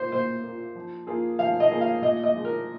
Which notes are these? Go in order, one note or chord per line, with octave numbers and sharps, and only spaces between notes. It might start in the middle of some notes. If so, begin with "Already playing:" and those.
Already playing: A#2 A#3 F4 C5
A#2 C5
A#3 F4
F3
A#3 F4 G#4
F3 F5
D#5
A#3 F4 G#4
F5
A#2 D#5
D#5
F3 G#3
A#4